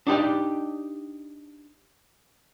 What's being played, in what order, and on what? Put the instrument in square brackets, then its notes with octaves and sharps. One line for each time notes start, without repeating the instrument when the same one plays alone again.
[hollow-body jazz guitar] D4 D#4 G4 D5